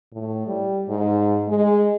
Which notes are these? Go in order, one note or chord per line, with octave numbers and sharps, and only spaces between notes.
A2
G3
G#2
G#3